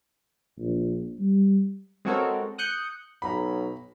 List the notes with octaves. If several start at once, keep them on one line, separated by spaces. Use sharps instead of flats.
A#1
G3
G#3 C4 F#4 A4 A#4 C#5
D#6 F#6 G6 C#7
B1 A#5 B5